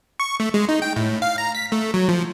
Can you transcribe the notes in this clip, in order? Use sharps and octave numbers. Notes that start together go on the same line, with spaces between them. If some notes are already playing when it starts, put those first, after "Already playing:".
C#6
A3
G#3
D#4
G5
A2
F5
A#5
B6
A3
F#3
F3